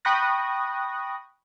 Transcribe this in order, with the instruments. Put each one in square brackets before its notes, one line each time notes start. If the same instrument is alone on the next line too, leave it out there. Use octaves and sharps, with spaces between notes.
[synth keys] G5 B5 C#6 D#6 F#6 A#6